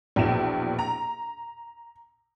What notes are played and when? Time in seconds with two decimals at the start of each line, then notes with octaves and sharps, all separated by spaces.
0.16 A#1 E2 B2 E4 E7
0.79 A#5